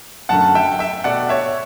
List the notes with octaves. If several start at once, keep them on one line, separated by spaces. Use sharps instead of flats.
F#2 D3 A3 F#5 A5
E5 G5
E5 G5
B2 A3 D5 F#5
C#5 E5